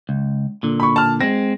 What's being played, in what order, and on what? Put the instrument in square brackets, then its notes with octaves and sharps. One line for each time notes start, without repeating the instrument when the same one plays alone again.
[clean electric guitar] C#2
A#2 D3
[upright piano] B5 C#6
A5 F6
[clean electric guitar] G#3 C4 [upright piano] A#6